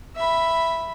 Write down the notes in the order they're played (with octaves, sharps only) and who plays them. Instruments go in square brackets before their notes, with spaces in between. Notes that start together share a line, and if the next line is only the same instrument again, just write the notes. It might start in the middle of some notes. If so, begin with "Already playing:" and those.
[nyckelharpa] E5 B5